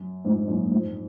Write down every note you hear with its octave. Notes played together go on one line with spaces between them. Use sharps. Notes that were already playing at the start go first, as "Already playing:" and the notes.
Already playing: F#2
F2 G#2
F#2 A#2
A#2
F2 G#2